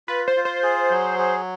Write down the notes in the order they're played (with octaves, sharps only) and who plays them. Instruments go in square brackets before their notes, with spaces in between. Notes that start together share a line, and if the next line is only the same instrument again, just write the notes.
[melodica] F4 [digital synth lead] B4
[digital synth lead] C5
[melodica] F4
[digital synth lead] C5
[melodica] G#4
F#3
G#4